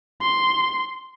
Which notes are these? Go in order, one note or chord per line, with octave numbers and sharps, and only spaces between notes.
C6